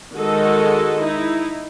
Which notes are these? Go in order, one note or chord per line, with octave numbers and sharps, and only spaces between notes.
D#3 G#3 F#4 A4 D#5
D#4 E4